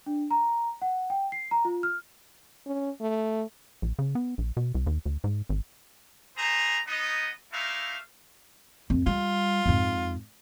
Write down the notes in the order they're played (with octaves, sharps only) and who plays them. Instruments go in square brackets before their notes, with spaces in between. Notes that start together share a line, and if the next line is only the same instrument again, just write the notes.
[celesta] D4
A#5
F#5
G5
C7
A#5
F4
F6
[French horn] C#4
A3
[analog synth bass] A#1
C#3
B3
A#1
B2
C2
D#2
D2
G#2
G#1
[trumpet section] A3 G#4 B4 C5 A#5
B3 D#4 D#5
A3 A#3 D#4 E4 E5 F5
[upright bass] F2
[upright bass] G3 [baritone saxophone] F4
[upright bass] F2 G#2